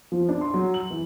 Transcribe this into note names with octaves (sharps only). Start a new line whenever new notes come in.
F3
D4
C6
F#3
F#7
E3